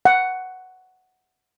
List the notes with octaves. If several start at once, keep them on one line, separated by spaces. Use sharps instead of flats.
F#5